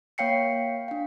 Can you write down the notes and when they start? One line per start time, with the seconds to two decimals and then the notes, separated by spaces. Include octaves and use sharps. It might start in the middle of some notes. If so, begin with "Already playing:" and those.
0.18 A#3 C#5 F5 G5 C7 C#7
0.88 D4 F5